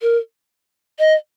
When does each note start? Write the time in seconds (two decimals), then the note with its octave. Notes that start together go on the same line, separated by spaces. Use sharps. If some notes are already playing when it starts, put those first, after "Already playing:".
0.02 A#4
0.99 D#5